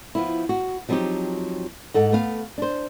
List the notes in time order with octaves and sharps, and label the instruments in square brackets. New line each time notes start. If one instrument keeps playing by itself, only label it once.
[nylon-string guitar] F3 B3 E4
F#4
F3 F#3 B3 C4 D#4 G4
G#2 A4 F#5
A3 B3 F5
D4 C5